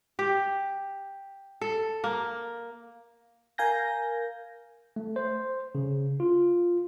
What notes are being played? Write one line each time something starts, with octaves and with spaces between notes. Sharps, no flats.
G4
A4
A#3
A#4 F5 G#5 G6 A#6
A3
C5
C#3
F4